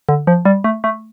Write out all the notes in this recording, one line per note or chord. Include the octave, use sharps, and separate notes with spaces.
D3
F3
G3
A3
A3